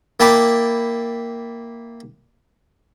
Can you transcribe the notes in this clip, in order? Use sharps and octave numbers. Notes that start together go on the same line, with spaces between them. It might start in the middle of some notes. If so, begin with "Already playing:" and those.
A#3 E4 G5 A5 B5 D6